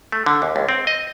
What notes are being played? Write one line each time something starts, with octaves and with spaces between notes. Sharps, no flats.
A3
D3
D#2
C#2
C4
D#5